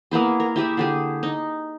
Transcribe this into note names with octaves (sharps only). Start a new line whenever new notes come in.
A#3 B3 E4 G#4
A#4
E4 G4 G#4 E5
D3 G4 G#4
D#4